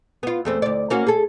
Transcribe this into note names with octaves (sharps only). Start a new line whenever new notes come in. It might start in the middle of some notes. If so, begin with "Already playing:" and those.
B3 F4
E2 A3 C4
D2 D5
A#3 C#4 F#4
G#4 A4